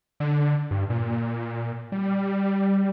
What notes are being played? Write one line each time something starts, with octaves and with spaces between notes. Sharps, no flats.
D3
G2
A#2
G3